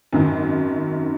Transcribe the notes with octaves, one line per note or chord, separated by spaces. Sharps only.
G#1 F#2 D#3